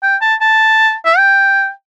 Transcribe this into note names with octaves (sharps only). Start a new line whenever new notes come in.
G5
A5
A5
E5
G5